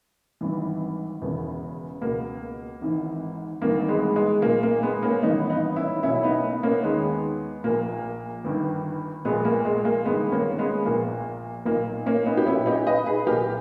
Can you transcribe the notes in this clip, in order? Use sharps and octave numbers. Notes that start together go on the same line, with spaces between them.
G#1 G2 E3
E1 E2 C#3 E3
C#2 B2 A#3
G#1 G#2 E3
G#1 G2 E3 A#3
G#3 B3
G#3
B1 A#2 A#3
A#3
G#3 B3
A#3 C#4
G#1 G2 E3 B3 D#4
B3 D#4
C#4 E4
B1 B2 C#4 E4
E4
B3 D#4
B3 D#4
A#3 C#4
D#2 D#3 G#3 B3
A#1 A#2 A#3
G1 G2 D#3
A#1 A#2 G#3 B3
A#3
G#3
A#3
G1 G2 D#3 G#3 B3
A#3 C#4
G#3 B3
A#1 A#2 A#3
B1 A#2 A#3
A#3 C#4
B3 D#4
G4
B1 A#2 C#4 E4
D#4 G4
B4 D#5
G#4 B4
B1 A#2 G4 A#4